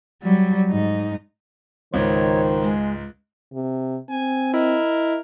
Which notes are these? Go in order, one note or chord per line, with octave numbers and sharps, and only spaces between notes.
F#3 G3
G#2 D#4
C#2 G#2 D#3 C5 C#5
G#3
C3
C4 G#5
E4 A#4 D#5